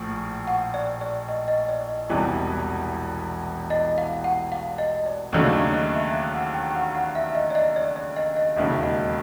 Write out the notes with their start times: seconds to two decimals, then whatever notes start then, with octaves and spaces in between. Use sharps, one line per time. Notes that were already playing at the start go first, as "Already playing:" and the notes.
Already playing: A#1 A2 F3
0.47 F#5
0.74 D5
1.01 D5
1.29 D#5
1.48 D#5
1.69 D5
1.89 D#5
2.09 E1 E2 C3 E3 G3 D5
3.70 D#5
3.98 F5
4.24 F#5
4.52 F5
4.78 D#5
5.06 D5
5.32 D#2 C#3 F#3 A3 D4 D#5
5.73 D#5
5.94 E5
6.14 F5
6.35 F#5
6.54 G5
6.75 F#5
6.95 F#5
7.15 E5
7.35 D#5
7.50 D5
7.55 D#5
7.76 D5
7.96 D5
8.16 D#5
8.36 D#5
8.56 E1 D#2 C#3 E5
8.83 D#5